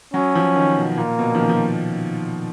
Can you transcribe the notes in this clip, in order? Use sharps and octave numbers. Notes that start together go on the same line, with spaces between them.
F#3 C#4
F3
D#3
B2
A#2 A#3
B2
F3
D#3
F3